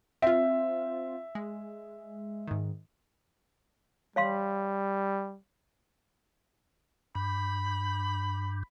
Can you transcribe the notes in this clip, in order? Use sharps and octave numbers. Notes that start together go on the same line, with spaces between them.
C4 F4 E5
G#3
G#2 D#3
G3 C#5 F5 C6
G2 B5